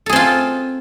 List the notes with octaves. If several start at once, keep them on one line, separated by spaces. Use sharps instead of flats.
C4 F4 G#4 A4